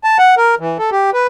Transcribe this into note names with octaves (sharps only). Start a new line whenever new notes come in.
A5
F#5
A#4
E3
A4
G4
B4